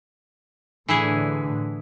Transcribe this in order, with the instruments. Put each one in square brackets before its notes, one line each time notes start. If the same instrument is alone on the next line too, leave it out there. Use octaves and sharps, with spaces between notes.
[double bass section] A2 D3 [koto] E3 E4 G#4